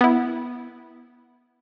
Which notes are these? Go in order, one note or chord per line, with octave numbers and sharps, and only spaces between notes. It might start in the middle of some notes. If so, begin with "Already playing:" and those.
B3 E4